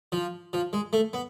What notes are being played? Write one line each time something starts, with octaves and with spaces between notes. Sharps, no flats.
F3
F3
G#3
A3
B3